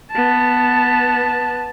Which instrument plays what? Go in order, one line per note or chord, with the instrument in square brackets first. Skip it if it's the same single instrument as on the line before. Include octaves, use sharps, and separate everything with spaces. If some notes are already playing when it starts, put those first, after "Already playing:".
[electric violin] B3 A5